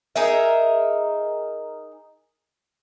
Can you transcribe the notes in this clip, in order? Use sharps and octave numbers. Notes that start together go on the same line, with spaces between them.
D#4 G#4 A#4 E5